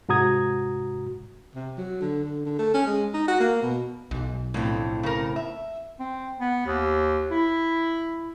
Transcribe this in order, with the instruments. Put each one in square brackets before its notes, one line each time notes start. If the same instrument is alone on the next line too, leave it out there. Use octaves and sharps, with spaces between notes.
[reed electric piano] G#2 C3 F#4 A#5 D#6 G#6
[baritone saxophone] C3
F#3
D3
D3
D3
A3
C#4
G#3
D#4
F#4
A#3
B2
[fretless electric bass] B1 [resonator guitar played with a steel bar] G#2
[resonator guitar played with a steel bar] F2 D3 [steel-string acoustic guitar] A2 C4
[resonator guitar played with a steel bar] C#3 A4 A#4
E5
[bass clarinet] C4
B3
D#2
E4